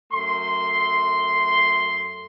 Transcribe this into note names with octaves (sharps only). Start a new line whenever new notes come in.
F#2 A3 C6